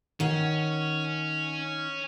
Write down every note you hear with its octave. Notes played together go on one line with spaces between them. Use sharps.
D#3 C#4 F#5